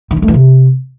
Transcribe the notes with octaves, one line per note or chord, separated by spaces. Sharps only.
D#3
G3
A3
E3
C3